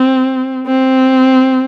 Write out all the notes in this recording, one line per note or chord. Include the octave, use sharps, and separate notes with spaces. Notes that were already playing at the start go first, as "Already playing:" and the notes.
Already playing: C4
C4